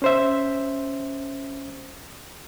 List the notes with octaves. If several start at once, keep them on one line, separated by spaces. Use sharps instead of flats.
C#4 C5 E5